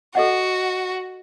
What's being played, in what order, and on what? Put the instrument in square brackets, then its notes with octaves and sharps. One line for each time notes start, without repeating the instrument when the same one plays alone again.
[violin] F#4 [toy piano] A4 D#5 F#5